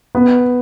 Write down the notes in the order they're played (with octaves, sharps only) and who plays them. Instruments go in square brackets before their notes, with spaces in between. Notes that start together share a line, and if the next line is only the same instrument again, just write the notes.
[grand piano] B3